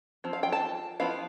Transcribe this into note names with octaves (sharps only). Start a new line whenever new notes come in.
F3 C4
F5
G5
A5
F3 B3 E4 F5